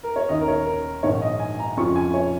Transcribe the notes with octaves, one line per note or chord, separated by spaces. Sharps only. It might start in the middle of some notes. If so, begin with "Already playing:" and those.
A#4
C#5
D#2 D#3 C#4 D#5
A#4
C#5
A#4
A#1 G#2 D#3 C#5
D#5
G#5
A#5
F2 C#3 F3 C#4 F4 C#6
G#5
C#5